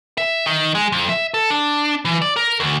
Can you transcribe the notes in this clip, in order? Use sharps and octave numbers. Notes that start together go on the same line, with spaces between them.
E5
D#3
G#3
F2
E5
A4
D4
E3
D5
A#4
D2